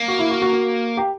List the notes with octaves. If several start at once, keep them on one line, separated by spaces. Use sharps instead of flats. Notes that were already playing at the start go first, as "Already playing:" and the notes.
Already playing: A#3
F#4
E4
F#4
F#4
F#4
G4